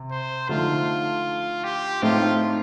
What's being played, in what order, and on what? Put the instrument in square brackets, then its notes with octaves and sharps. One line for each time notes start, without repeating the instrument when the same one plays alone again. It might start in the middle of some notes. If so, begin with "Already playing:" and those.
Already playing: [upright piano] C3
[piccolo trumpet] C5
[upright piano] D3 F3 A3 D#4 [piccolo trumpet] F4
[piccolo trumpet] G4
[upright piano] A2 A3 C4 D#4 [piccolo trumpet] F4